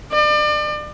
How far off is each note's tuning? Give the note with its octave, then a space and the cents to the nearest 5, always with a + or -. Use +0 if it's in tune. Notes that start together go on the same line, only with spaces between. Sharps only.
D5 +35